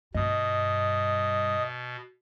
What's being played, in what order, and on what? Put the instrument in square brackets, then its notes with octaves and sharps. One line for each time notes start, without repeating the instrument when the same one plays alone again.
[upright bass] G2 [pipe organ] B2 [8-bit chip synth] D#5 D#6